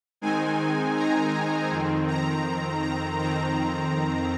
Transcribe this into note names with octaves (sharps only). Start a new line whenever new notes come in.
D#3 G#3 C4 D#4 G#5
A#5
F2 D#3 C4
A#5
A#5
F2 D#3 C4 A#5